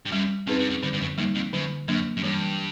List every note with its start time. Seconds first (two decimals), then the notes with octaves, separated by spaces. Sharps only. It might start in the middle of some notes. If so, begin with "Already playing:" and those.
0.06 G2
0.12 F#2 G3
0.47 F#2 C4 D#4 G#4 B4
0.59 G2
0.70 F#2
0.83 G2 D3
0.93 G2
1.01 F#2
1.18 F#2 G3 A#3 D#4
1.35 F2
1.53 F#2 D3
1.88 F#2 F#3 A#3 D4
2.17 F#2
2.23 G2 E3